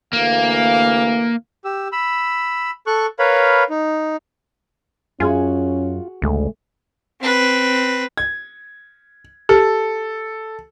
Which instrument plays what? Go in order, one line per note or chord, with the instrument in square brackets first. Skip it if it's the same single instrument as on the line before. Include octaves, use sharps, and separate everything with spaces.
[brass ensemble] D2 E3 F5 [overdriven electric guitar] A#3
[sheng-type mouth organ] G4 E6
B5 E6
A4 C#6 F#6
A#4 B4 C#5 F5 B5
D#4
[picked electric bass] F#2 [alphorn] C#4 [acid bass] F4 [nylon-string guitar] F#4 G#4 G#5
[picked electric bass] A1 C#3 G#3 [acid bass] D2 [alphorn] A3
[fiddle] C4 B4
[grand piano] G#6
[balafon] G4 [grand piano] A4